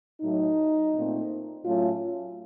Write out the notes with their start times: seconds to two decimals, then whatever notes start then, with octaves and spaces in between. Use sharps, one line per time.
0.21 A2 F#3 A3 D#4
0.94 A#2 A3 C4
1.65 A2 F#3 A3 C#4 F4